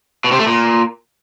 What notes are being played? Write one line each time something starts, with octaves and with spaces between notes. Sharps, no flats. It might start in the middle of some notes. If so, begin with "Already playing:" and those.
B2
C3
A3
A#2